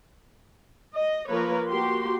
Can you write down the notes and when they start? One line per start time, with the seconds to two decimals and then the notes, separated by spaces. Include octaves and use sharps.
0.93 D#5
1.27 F3 A#3 A#4 B4 C#5
1.68 A#3 F#4 G4 C6